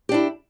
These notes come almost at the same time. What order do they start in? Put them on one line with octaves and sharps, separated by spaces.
G4 D4 E4